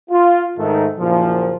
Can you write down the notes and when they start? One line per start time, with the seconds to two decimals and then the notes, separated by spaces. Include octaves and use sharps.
0.10 F4
0.58 G#2 D#3 A3 D#4
0.99 F#1 A#2 F3